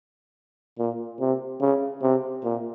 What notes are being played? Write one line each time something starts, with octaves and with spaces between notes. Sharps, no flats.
A#2
C3
C#3
C3
A#2